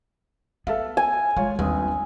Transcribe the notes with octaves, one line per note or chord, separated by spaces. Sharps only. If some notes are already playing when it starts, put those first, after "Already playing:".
B3 A4 E5 F5
G#5
G#3 F4 C#5
G1 D#2 C4 D#6